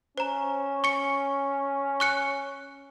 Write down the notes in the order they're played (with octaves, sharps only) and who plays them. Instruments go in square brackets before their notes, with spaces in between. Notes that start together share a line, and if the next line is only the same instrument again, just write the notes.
[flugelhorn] C#4 [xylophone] C5 A#5
[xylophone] C#6 C#7
C#6 F#6 C#7